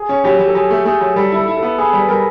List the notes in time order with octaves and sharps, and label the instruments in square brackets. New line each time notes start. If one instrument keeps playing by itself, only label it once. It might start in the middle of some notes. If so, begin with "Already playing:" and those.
Already playing: [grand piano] G#4
[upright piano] C#4
[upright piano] F#3 [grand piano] G4
[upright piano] F#3
[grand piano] A4
[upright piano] F#3 [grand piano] G#4
[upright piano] A3
[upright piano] A3 [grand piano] G#4
[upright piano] F#3
[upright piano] G3 [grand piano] A4
[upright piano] E4 [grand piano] A4
[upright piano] E4
[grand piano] A4
[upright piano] B3
[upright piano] B3 [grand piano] G#4
[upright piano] G3
[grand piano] B4
[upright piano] G3 [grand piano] A#4